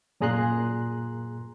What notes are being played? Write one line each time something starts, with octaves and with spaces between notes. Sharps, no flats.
F#2 A#2 G#4 A#5 C6 F#6